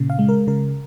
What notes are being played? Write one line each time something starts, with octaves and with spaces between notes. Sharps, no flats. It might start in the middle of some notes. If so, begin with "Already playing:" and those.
Already playing: A#2 C#3
F5
G#3
A#4
C#3 A#4